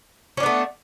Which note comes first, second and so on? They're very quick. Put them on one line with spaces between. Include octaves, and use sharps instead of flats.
C#4 D4 B3 A3